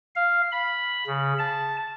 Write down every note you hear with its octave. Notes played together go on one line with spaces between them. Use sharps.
F5
B5
C#3
A5